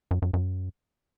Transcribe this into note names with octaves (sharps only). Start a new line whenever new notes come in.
F#2
F#2
F#2